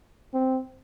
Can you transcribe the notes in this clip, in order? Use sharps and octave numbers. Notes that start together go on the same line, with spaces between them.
C4